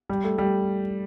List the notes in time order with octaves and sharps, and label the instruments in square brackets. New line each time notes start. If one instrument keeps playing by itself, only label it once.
[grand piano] G3
A3
G3